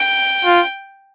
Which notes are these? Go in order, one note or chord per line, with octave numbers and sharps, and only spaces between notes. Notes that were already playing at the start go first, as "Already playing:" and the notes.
Already playing: G5
F4